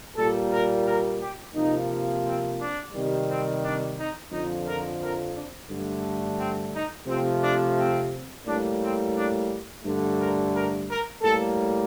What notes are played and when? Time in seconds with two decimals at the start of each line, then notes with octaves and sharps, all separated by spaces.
0.16 A#2 G3 A#3 A4
0.51 A#4
0.85 A#4
1.20 G4
1.54 C3 F3 A#3 D#4
2.24 C4
2.58 D4
2.93 C3 D#3 G3
3.28 C4
3.62 D4
3.97 D#4
4.31 F2 D3 F3 D#4
4.66 A#4
5.00 A#4
5.35 D4
5.70 G2 D3 A3
6.38 C4
6.73 D#4
7.07 C3 F3 A3 C4
7.42 D4
7.77 C4
8.46 A2 G3 A#3 D4
8.81 C4
9.15 D4
9.84 G2 D3 A3
10.19 A#4
10.53 A#4
10.88 A#4
11.22 A2 G3 A#3 A4